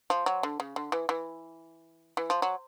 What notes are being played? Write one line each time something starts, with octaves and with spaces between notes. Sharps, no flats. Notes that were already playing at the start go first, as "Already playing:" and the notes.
F3
F#3
D3
C#3
D3
E3
E3
E3
F3
F#3